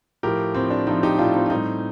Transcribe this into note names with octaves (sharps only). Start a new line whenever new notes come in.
A2 F3 G4 A#4
A2 F3 C4
D4
A2 F3 C4 D#4
D#4 G4
A2 F3 D4 F4
C4 D#4
F4
A2 G3 C4 D#4